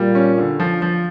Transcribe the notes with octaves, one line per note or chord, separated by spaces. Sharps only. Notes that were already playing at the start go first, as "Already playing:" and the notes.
Already playing: A#2 G3
C#4
D3
F3
F3